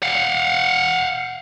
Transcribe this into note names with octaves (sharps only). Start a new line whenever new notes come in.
F5 F#5